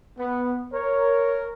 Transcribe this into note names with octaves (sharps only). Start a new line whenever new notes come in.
B3
A#4 C#5